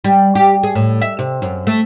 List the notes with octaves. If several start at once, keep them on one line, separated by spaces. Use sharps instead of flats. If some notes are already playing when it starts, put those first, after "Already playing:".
G3
G4
G#4
A2
E5
C3
F#2
A3